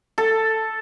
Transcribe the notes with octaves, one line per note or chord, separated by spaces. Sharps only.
A4